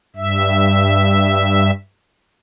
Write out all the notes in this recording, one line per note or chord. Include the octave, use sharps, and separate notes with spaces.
G2 E5